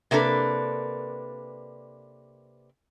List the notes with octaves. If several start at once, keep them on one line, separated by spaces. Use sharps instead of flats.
C3 A#3 D4 A4 B4